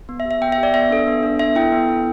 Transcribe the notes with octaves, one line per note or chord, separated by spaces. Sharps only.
B3
E5
G4
E5
B3 G5
E5
G4
D5
B3 E5
D4 A4
B3
D4 A4
B3 E5
E4 A4 G5
B3
E4 A4